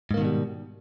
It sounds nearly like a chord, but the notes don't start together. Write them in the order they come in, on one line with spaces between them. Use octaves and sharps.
G#2 A#3 D#3 B2 G3